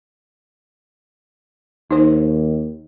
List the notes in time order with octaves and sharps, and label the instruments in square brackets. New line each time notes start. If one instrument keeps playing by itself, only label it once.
[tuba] D#2 [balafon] D#4 C5